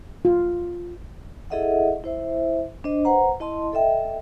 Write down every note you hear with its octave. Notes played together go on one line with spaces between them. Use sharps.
F4
E4 G#4 A4 D#5 E5 F#5
E4 C5 E5
D4 C5 D#5
B4 C5 F#5 A#5
E4 D#5 A5 C6
A4 D#5 E5 G5